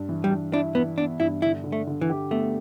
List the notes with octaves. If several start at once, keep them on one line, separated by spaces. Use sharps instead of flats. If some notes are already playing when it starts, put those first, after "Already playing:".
Already playing: G2
E3
G3
G2
D4 E4
E3 B3
B3 D4
G2 E4
D3 E4
D3
A3
D3
E3
G4
A3 B3